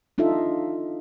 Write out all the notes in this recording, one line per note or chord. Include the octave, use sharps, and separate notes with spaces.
D4 D#4 F4 A4 E5